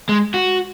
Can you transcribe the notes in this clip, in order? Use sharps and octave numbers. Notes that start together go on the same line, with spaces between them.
G#3
F#4